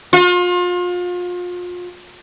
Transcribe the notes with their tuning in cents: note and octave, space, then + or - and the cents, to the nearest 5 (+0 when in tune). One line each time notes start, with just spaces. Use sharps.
F4 +35